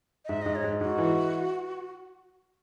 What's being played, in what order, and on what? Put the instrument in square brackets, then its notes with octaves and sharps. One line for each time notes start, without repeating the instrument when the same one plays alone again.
[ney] D#5
[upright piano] G#2 [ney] E5
[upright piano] G#2 [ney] D#5
[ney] C#5
[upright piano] G#2
[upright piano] G#2 [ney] F#4
[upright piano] E3